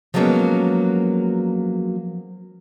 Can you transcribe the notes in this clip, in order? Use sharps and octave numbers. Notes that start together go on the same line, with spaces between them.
F3 F#3 G#3 A#3 B3 C#4